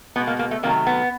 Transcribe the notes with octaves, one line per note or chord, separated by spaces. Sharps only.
B2 G#3 B3
A#3
A#3
A3
C3 D#3 F#3 A3 A#3
B3